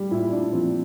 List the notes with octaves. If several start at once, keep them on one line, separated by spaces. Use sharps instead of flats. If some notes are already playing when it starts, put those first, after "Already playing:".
Already playing: G3
A#2 E4
A#2 D4
F3 C4